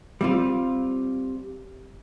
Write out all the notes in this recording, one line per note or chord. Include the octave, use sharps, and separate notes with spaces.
G3 C4 F4